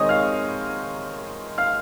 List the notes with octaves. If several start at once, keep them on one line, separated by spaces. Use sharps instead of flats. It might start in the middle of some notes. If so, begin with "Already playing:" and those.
Already playing: D#3 G#3 C4 C#5 D#5 C#6 D#6
F5 F6
F5 F6